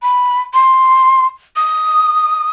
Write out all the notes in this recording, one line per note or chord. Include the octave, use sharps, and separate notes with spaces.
B5
C6
D#6